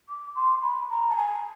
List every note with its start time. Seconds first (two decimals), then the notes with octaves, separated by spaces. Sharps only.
0.09 D6
0.36 C6
0.62 B5
0.90 A#5
1.10 A5
1.17 G#5